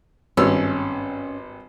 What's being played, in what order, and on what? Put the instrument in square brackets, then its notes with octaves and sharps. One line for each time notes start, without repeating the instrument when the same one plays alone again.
[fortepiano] G#1 G2 E6 [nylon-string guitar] C#4